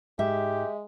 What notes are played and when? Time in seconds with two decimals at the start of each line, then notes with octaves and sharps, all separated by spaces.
0.19 G#2 G#3 G4 E5